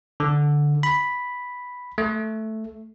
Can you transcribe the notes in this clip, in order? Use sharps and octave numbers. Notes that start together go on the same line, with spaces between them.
D3
B5
A3